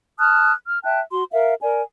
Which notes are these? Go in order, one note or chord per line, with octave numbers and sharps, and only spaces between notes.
A5 D#6 F6 F#6
F6
E5 G5 A5 F#6
F#4 C6
A#4 E5 F5
A#4 D5 G#5